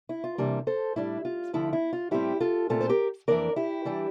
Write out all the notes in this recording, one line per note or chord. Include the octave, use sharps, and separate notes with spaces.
E4
F4
C3 E3 G3 A#3 D4
A4 C5
A2 G3 D4 E4
F4
D2 D3 F3 E4
E4
F4
A2 G3 C4 E4 G4
F4 A4
A#2 A3 C4 F4 A4
C5
G4 A#4
F2 E3 A#3 D4 A#4 D5
E4 G4
E3 G3 D4